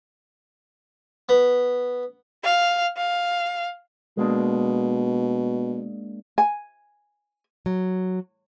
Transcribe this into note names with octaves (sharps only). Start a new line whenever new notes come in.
B3
F5
F5
B2 G#3 A#3 D4
G#5
F#3